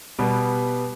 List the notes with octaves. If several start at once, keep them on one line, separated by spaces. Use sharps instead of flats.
B2 G3 B3